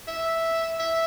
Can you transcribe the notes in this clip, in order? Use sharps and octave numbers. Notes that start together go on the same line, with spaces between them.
E5
E5